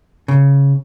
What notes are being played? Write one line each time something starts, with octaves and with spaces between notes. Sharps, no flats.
C#3